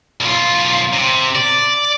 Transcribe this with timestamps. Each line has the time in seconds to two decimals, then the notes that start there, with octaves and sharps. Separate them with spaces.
0.21 B1 F4
0.93 C3
1.35 D5